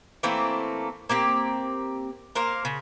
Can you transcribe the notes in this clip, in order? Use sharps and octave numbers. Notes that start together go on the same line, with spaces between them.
E3 A3 A#3 C4
A#3 C4 G4
A#3 A#4 C5 F5
C#3